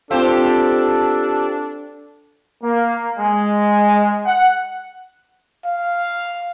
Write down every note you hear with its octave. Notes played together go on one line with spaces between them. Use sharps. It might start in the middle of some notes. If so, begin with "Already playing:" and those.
C4 D4 F4 G4 A4 C5
A#3
G#3
F#5
F5